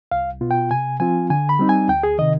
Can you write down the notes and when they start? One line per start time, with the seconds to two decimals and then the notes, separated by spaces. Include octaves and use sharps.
0.11 C2 F5
0.41 B2 B3 F4
0.51 G5
0.70 C3 G#5
1.00 F3 C4 F4 G#5
1.30 D3 G#5
1.49 B5
1.59 G3 C4 D#4
1.69 G#5
1.88 D2 G5
2.03 G#4
2.18 C3 D#3 D#5